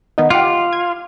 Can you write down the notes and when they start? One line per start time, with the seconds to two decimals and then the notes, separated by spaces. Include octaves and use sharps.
0.18 D#3 B3 D#4
0.30 F4 G4 F#5 D6
0.73 G#6